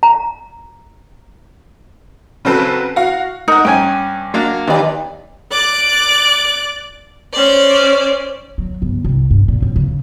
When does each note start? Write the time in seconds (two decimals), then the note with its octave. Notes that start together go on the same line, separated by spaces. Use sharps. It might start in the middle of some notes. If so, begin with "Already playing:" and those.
0.03 A#5
2.45 C#3 F#3 C4 A4 B4
2.96 F#4 F5
3.48 D#4 A#4 F#5
3.65 G2 C#4 G5 G#5
4.34 F#3 A#3 D4
4.67 D#2 D#4 B4 D5
5.52 D5 D6 F#6
7.33 C#4 C5 D5
8.58 F#3
8.82 G1
9.04 C2
9.31 G2
9.48 A#2
9.62 A1
9.76 C#3